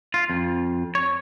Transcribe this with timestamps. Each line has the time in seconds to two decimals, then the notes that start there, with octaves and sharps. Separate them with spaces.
0.14 F4
0.30 F2
0.95 C#5